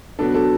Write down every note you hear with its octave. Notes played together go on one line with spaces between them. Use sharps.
B2 F#3 B3 D4 A4
A4